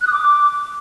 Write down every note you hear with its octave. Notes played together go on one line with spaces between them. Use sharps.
F#6
D#6
D6